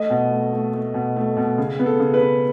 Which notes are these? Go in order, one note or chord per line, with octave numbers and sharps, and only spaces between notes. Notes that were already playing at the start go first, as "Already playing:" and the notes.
Already playing: A3 D#5
B2
A3
A3
A3
B2
A3
B2
C#3
B3
A4
C#3
B4
C#3